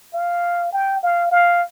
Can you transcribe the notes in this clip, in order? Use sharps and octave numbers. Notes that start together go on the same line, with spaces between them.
F5
G5
F5
F5